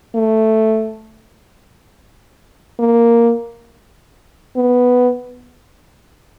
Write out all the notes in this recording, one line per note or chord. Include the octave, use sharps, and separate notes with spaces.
A3
A#3
B3